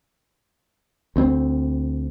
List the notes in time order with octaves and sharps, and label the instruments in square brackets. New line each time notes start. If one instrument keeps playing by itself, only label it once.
[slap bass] D2 C4